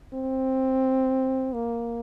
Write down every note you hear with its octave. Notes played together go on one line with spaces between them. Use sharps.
C4
A#3